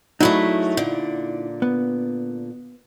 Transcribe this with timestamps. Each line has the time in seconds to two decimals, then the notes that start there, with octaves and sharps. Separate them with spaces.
0.20 F#3 G#3 A3 D#4 E4 D5
0.77 A#2 D3
1.62 B3